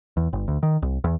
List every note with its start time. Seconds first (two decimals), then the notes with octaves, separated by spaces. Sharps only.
0.17 E2
0.33 G1
0.48 D2
0.63 D#3
0.82 C2
1.04 E2